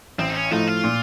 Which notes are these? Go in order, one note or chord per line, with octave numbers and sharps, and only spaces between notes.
A1 C4
D#4
C#4
A2 F3 A3 D#4
F4
A#2